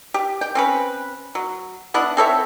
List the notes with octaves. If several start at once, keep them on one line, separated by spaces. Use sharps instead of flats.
G4
G5
C4 C#4 B4
F#3
B3 D4 E4 F#5
C4 A4 C#5 E5